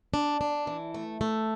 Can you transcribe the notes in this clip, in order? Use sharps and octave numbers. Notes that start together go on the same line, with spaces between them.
D4
D4
E3
A3
A3